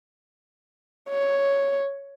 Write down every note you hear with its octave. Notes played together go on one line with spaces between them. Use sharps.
C#5